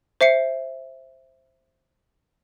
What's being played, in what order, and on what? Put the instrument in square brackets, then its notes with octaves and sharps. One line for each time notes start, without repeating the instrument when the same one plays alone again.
[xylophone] C5 E5 C7 C#7